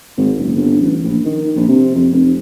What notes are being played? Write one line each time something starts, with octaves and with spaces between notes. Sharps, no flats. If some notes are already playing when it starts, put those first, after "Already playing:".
G#1
F#1
G1
A1
A#1
D#3
A#1
C3
F2
F1